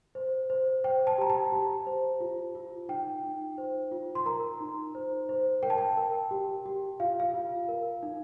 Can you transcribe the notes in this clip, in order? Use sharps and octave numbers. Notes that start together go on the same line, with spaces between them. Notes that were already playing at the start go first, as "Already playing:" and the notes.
C5
C5
C5 G5
A5
G4 A#5
A5
G4
C5
F4
F4
D#4 G5
D#4
C5
F4
C6
A#4 A#5
D#4
C5
C5
A#4 G5
A5
G5
A#4
G4
G4
F4 F5
F5
F4
A#4
D#4